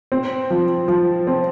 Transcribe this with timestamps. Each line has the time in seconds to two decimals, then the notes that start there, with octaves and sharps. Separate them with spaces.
0.12 C4
0.50 F3
0.88 F3
1.27 C4